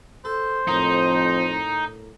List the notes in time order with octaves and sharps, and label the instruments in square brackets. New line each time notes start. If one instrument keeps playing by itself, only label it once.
[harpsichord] A4 [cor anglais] C5
[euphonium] F2 [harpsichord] A2 A#3 [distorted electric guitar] D#4